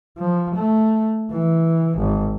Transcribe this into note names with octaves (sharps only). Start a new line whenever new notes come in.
F3
A3
E3
G#1